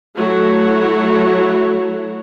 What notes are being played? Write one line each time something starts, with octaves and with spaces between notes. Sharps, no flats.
F#3 A3 E4 F#4 C#5